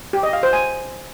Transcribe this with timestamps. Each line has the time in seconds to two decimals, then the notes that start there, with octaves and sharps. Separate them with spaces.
0.13 G4
0.23 D#5
0.33 F5
0.43 C5
0.53 G#5